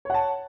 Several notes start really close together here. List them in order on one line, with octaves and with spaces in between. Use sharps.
C#5 F#5 A5